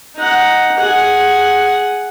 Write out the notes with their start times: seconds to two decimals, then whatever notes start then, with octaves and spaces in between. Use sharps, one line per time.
0.16 D#4 F#5
0.77 G#4 F#5